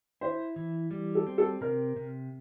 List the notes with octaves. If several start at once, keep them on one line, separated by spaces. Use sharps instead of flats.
E4 C5
E3
G3
A4
C4
A4
C3 A#4
C3